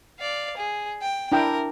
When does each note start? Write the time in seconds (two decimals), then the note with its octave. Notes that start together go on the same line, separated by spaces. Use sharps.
0.19 D5 F5
0.57 G#4
1.01 G5
1.32 D4 E4 A#4 G5